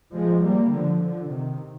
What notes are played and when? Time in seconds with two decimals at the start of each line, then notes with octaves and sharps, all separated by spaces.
0.14 F3 G#3
0.43 G3 A#3
0.72 D3 F3
1.00 D3 F3
1.29 C3 D#3